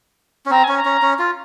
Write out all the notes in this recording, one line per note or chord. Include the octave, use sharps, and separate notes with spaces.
C#4
C4 A#5
C#4 G#5
A#5
C#4
C#4
F4